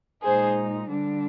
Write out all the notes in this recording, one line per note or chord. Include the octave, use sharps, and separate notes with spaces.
A#2 G#3 D#4 G#4 C5
D3 G3 D4